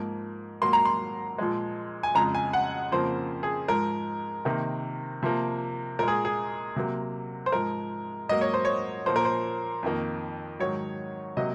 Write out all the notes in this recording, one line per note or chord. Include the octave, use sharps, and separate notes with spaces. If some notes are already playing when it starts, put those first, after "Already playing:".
Already playing: G#2 F3 A#3
G#2 F#3 A#3 C6
A#5
C6
A#2 F3 G#3
G#5
F2 C#3 G#3 A#5
G#5
F#5
F2 C#3 F3 A#3 C5
G#4
G#2 F3 G#3 A#4
C3 D#3 A#3
C3 F3 A#3
A#2 G#3 A#4
G#4
G#4
C3 F#3 A#3
C5
G#2 F3 G#3 A#4
G#2 F#3 A#3 D#5
C#5
C5
C#5
A#2 F3 A#3 C5
A#4
C5
F2 D#3 A#3
G#2 D#3 F#3 C#5
C3 F#3 A#3 D#5